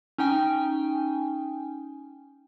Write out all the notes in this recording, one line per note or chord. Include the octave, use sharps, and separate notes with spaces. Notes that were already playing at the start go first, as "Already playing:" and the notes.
C#4 D#4 G5 G#5